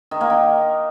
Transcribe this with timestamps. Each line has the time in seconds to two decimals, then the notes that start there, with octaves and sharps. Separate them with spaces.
0.11 D#3
0.21 A#3
0.30 D#3